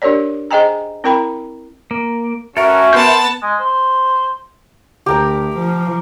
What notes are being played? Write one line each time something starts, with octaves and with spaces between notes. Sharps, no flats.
D4 G4 A#4 C#5 D5
G#4 C5 D#5 G5 G#5 A#5
C4 E4 A#4 G5 A#5 B5
A#3
C#4 F#4 A4 A#4 E5
B3 A#4 A5 C6 G6
G#3
C5
D2 G4 A#4 A#5
F3